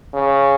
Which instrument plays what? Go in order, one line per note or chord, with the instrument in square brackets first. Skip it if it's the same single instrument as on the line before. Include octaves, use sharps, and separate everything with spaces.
[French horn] C#3